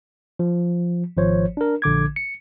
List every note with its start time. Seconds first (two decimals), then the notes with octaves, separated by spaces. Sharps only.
0.39 F3
1.17 G#1 F3 C5 C#5
1.57 D4 A#4
1.82 A#1 D3 D6 G#6
2.16 C#7